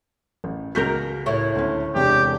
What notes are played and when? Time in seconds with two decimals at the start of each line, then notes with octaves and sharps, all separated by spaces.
0.44 A1
0.75 C#2 F#4 A#4 G6 B6
1.26 A2 E4 C#5
1.55 D2 C#4
1.95 E1 C3 D4 G4